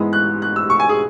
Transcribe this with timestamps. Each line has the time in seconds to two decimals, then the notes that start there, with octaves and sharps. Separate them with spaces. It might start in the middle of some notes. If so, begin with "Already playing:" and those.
Already playing: G#2 E3 G#3 B3 E4
0.13 F#6
0.42 F#6
0.56 E6
0.70 C#6
0.80 G#5
0.89 G#4